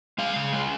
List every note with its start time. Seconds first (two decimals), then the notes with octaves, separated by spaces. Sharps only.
0.18 G#3 F5
0.36 C#3
0.53 G#3